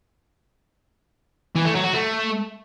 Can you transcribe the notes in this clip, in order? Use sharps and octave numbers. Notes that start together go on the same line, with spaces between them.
E3
A3
F#3
F#4
A3